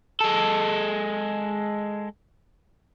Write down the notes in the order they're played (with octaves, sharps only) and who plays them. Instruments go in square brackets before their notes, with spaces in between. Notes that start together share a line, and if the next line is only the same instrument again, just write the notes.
[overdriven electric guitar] G#3 A4